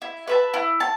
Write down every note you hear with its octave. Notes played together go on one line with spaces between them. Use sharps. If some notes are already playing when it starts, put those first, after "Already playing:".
E4
B4 E5 A5
E4
A5